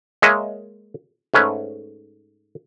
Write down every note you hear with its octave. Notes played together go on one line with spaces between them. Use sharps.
G#3 A#3 G#4 C#5 D#5 E5
G#2 A3 C#4 B4